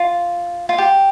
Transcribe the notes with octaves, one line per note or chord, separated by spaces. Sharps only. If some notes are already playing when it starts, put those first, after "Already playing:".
Already playing: F4
F4
G4